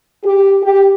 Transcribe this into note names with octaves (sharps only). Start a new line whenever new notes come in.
G4
G4